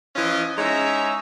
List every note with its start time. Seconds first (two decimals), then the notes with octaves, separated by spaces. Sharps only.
0.16 E3 F3 C#4 F4 D#5
0.57 G#3 C#4 D#4 E5 A#5